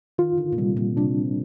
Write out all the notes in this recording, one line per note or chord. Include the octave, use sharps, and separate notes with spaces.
D#3 F4
D3
A#2
C3 G3
A#2
C3 D4